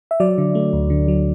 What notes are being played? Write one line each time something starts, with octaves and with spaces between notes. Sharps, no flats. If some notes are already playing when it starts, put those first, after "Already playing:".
E5
F#3 D5
D3
A3
D2
D3
F#3